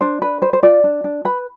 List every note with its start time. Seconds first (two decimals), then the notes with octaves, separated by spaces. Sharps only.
0.01 D4 C5
0.22 D4 B4
0.42 B4 C5
0.53 C5
0.63 F4 D5
0.84 D4
1.04 D4
1.25 B4 B5